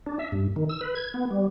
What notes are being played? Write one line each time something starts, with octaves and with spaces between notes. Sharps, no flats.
D4
E5
G2
D#3
E6
B4
G#6
B3
G3